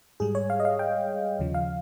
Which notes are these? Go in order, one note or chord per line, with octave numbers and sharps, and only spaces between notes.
G#2 G3 G#4
C#5
F5
D#5
F5
G5
D#2 C#3 F3
F5